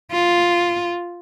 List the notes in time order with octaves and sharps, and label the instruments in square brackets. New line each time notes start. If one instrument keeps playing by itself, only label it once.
[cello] F4